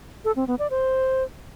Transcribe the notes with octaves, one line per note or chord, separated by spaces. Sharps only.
A4
C4
B3
D5
C5